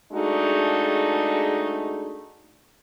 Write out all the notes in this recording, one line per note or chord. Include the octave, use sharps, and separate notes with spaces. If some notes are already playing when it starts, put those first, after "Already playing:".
G#3 A3 D4 D#4 F#4 G#4